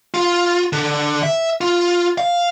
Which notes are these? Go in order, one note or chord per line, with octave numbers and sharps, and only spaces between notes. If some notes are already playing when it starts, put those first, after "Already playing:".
F4
D3
E5
F4
F5